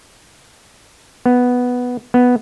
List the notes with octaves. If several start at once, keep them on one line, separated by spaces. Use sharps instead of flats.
B3
B3